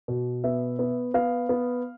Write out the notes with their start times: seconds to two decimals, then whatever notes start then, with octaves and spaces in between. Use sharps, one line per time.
0.08 B2
0.44 B3 E5
0.79 B3
1.14 B3 F5
1.49 B3